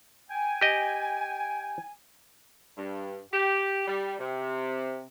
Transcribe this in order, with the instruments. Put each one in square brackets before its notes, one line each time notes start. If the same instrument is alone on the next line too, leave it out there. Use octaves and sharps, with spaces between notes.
[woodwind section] G5 G#5
[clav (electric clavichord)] G4 D#5
[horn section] G2
G4
G3
C3